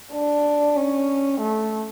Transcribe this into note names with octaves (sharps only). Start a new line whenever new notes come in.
D4
C#4
A3